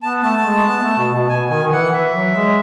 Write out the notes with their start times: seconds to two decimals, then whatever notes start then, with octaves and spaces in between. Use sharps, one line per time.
0.03 B3 A5
0.23 A3 A5
0.45 G#3
0.66 B3
0.83 A3
0.98 B2
1.14 B2
1.29 B2 G#5
1.50 D#3 G#5
1.63 D#3
1.72 E3 F#5
1.93 E3 E5
2.14 F#3
2.35 G#3